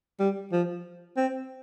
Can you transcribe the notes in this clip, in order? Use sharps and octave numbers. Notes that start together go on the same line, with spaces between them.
G3
F3
C4